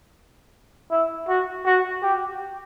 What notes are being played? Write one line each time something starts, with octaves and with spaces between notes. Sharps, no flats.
E4
F#4
F#4
G4